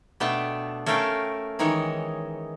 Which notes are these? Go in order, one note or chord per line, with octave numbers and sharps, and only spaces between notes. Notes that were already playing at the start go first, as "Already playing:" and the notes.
B2 A3 B3 D4 G5 A5
A3 C#4 A4 A#4 F5 G5
D#3 E3 G#3 D#4 C#5